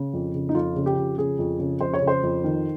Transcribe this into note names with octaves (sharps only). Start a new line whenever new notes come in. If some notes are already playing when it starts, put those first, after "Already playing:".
Already playing: C#3
F2
C#3
D#4
F2 F4
C#3
G4
F2
C#3 G#4
F2
C#3
F2 C5
C#5
C#3
C5
F2
D#3